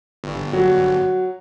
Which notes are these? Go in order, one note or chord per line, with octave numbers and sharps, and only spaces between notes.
G1
F#3